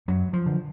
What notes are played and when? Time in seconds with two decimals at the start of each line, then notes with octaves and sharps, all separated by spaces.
0.08 F#2 F#3
0.33 F3
0.46 D3